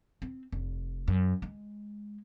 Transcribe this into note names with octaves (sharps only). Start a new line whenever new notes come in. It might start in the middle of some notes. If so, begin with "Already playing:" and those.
C4
F1
F#2
G#3